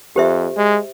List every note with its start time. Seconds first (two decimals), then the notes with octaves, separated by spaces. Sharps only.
0.16 F2 G4 C5 E5
0.57 G#3